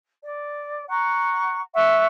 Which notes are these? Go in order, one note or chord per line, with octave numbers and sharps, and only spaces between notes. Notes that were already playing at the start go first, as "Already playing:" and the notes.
D5
F#5 A#5 C#6
E5 F#5 C#6